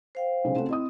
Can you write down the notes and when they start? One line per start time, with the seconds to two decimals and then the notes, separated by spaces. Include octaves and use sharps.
0.15 C5 F5 G5
0.44 B1 C#3 G#3
0.56 C#3 A3 C4 F#4
0.69 E4 D#5 D#6